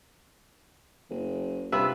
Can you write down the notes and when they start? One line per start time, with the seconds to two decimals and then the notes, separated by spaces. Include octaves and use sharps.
1.10 F#1
1.72 G2 C3 F4 B4 E5 B5 E6